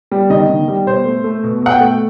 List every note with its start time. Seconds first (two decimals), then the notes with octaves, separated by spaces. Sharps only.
0.11 G3
0.30 D#3 D#5
0.49 D#3
0.68 G3
0.87 B2 C5
1.05 A3
1.24 A3
1.43 B2
1.62 B2 F#5
1.70 G5
1.80 A3